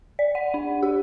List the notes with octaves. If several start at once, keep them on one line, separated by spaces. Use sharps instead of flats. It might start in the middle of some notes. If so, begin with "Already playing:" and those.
D5
F#5
D4
G4